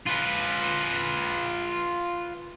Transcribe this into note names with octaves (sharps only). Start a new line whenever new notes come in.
F4 B4